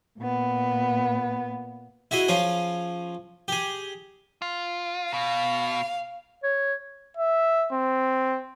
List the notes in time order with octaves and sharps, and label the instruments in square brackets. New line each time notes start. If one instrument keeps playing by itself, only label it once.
[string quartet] A#2 B3
[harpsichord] E4 F#4 G#4 D#5
F3 C#4 F4 G#4
G4 G#4
[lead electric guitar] F4
[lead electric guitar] B2 [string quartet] F5
[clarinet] C#5
[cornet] E5
C4